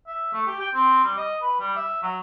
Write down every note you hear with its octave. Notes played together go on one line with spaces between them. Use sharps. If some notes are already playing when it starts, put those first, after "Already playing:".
E5
A3
G4
G5
C4
G3
D#5
B4
G3
E5
F#3